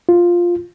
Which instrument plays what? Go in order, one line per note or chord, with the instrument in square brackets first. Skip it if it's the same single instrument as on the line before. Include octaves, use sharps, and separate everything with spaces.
[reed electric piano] F4